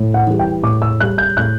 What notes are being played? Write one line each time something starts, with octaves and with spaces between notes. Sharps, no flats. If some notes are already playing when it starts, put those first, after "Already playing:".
Already playing: A2
F#5
E3 G3
G5
A2 D6
E6
G3 F#6
G6
A2 F#6